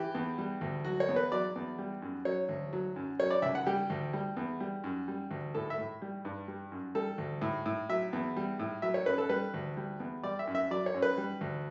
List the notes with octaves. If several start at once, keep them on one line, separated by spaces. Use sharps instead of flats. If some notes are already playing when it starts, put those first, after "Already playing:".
Already playing: E3 G4
E2
G3
D2
F#3 F#4
C#5
E2
B4
F#3 D5
E2
G3
F#2
F#3 C#5
D2
F#3
F#2
F#3 C#5
D5
C#2 E5
F#5
G3 G4
D2
G3
E2
G3
F#2
G3
D2
A2 A4
E5
A2
G3
G2
G3
F#2
G3 A4
D2
A2
A2
F#3 E5
E2
G3
A2
F#3 E5
C#5
F#2 B4
A4
G3 B4
D2
G3
E2
G3 D5
E5
F#2
E5
F#3 D5
C#5
F#2
B4
G3
D2